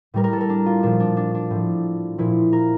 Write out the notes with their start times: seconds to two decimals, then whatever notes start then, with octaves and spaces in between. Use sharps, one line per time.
0.14 A2 G3 A#4
0.24 A#4
0.33 A4
0.41 A#4
0.49 D4
0.66 F4
0.83 A#2 F3 D4
1.00 D4
1.17 D4
1.34 D4
1.51 A2 F3
2.18 A#2 F3 E4
2.53 A#4